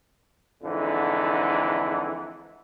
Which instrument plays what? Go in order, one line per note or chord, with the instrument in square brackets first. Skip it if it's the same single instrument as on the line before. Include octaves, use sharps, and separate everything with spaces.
[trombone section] F2 G#2 D3 E3